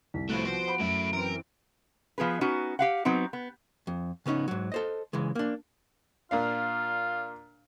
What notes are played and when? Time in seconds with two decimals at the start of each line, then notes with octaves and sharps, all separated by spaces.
0.14 C2 B6
0.30 F3 A3 B3 E4 F#4 D7
0.46 C5
0.68 B5
0.80 F#2 A2 E4
1.13 E3 C4 A#4
2.18 F3 B3 G#4 B4
2.41 B3 C#4 D#4 F#4
2.79 G4 F5 F#5
3.05 F#3 B3 C4 D#4
3.33 B3
3.87 F2
4.26 C#3 B3 C#4 D#4
4.48 G#2 F#3
4.72 A4 C5 D#5
5.13 C#3 E3 G#3
5.35 A#3 D4
6.31 A#2 D4 F4 F5